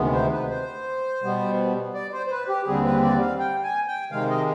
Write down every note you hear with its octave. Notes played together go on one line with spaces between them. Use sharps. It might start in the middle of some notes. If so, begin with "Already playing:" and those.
Already playing: D2 C3 D#3 G#3 B3
C5
B4
C5
B2 G3 B3
D5
C5
C5
B4
G4
D#2 D3 G3 C4 G#4
B4
D5
F5
G5
G#5
G5
C3 D#3 G#3 F5
D#5